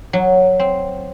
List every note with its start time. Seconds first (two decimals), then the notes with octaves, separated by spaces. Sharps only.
0.13 F#3
0.60 C4